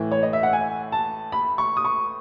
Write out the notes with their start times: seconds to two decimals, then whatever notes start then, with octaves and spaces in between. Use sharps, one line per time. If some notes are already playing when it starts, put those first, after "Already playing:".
Already playing: A2 E3
0.12 C#5
0.23 D#5
0.33 E5
0.43 F#5
0.53 G#5
0.92 A5
1.32 B5
1.58 C#6
1.77 D#6
1.85 C#6